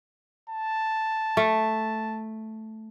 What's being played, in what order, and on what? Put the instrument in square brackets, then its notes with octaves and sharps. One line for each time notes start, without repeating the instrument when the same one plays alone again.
[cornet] A5
[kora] A3